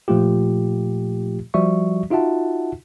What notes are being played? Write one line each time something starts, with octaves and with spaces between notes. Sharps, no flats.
A#2 F3 A3 F4 G4
F3 G3 F#4 D5 E5 C#6
D#4 F4 F#4 E5 F#5 A5